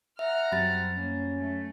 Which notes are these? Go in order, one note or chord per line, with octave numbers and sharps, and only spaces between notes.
E5 F#5 A#5 F6
F#2 F#3 G3 C4 B5 A6
A#3 C#4
A3